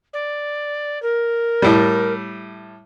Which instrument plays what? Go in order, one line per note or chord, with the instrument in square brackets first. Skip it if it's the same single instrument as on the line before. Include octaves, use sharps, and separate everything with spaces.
[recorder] D5
A#4
[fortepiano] A2 G3